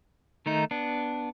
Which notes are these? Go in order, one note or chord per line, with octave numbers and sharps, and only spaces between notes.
D#3 A3 D#4
B3 D4